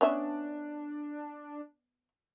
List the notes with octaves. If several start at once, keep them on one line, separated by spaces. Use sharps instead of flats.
B3 C#4 D4 E5